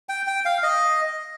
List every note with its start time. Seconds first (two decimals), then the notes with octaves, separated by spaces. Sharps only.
0.09 G5
0.27 G5
0.45 F5
0.63 D#5